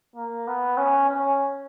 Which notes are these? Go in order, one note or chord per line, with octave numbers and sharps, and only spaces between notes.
A#3
B3
C#4
C#4